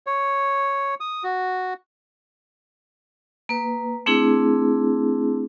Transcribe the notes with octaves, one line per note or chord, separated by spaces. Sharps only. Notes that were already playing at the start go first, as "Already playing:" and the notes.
C#5
D#6
F#4
A#3 B4
A3 C4 D4 E4 G#4